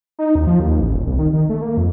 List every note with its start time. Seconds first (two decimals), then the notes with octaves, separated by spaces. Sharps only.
0.19 D#4
0.35 D#2
0.47 F3
0.60 D#2
0.80 A1
0.94 D#1
1.06 C2
1.19 D#3
1.33 D#3
1.49 A3
1.62 A#3
1.77 F2